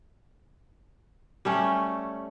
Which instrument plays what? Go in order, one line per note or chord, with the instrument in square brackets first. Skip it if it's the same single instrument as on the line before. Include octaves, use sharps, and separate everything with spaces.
[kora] G3 A3 C#4